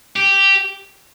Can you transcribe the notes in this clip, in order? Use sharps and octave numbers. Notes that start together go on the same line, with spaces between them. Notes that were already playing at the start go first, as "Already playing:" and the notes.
G4